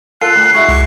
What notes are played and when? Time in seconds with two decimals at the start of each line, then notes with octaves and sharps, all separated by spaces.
0.21 F4 A4 F#6 C7
0.35 D2
0.54 G#3 E4 F#4 C#6
0.69 C#2